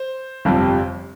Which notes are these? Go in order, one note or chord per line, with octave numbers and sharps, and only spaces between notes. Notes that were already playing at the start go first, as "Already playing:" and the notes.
Already playing: C5
G1 F2 C3 G3 C4